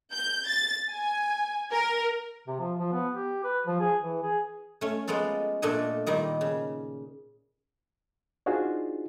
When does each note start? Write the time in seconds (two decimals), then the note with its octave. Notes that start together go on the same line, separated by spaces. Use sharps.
0.13 G6
0.48 A6
0.90 G#5
1.72 A#4
2.48 C3
2.59 F3
2.77 F3
2.93 B3
3.13 G4
3.44 B4
3.67 F3
3.80 G#4
4.02 E3
4.23 G#4
4.81 A3 C#4
5.08 G#3 A#3 B3 F4 A4
5.62 A#2 A3 D4 A4 D#5 G#5
6.06 A#2 D#3 G3 D#5
6.41 C#3
8.46 D4 D#4 F4 F#4 G#4 C5